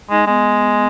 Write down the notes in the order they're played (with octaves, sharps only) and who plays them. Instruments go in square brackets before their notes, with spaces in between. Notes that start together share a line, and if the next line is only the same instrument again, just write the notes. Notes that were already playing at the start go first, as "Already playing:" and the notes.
[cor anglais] G#3 [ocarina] D#4
[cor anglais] G#3 [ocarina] B3